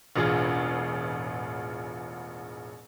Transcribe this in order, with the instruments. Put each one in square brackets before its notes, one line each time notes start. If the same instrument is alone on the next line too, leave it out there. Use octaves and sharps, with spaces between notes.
[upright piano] E1 A1 F4 G#4